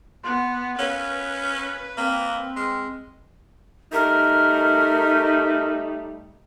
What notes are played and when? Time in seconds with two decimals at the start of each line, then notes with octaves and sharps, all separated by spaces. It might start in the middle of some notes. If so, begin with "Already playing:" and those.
0.24 B3 C6 F#6
0.79 C#4 A#4 B4 C#5 F5
1.97 A#3 C4
2.56 G#3 C6 F6
3.92 G3 A3 D#4 A#4